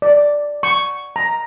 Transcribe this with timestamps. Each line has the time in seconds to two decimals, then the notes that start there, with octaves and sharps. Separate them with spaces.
0.02 D5
0.63 C#6
1.16 A#5